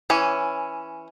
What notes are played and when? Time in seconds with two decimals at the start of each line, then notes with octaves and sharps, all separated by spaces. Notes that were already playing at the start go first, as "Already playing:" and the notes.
0.10 E3 C#4